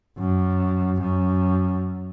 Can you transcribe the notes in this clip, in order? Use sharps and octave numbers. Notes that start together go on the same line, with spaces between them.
F#2
F#2